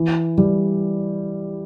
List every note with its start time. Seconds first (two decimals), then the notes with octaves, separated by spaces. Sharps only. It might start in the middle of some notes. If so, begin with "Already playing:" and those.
Already playing: E3
0.38 G3